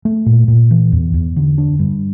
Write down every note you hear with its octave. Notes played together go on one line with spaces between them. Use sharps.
A3
A#2
A#2
E3
E2
E2
D3
D4
G2